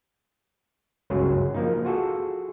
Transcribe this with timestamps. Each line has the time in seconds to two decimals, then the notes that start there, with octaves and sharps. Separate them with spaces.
1.10 G1 C#2 F#2 F#3 G#4
1.54 F3 A#3 D#4
1.85 F4 F#4 G#4 A4